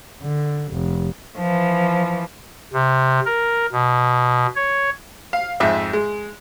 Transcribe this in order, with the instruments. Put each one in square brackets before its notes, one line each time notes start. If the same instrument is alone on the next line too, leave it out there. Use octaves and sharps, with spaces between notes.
[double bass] D3
F1
[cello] E3 F3
[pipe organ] C3
A#4
B2
C#5
[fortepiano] F5
F2 G#2 E5
G#3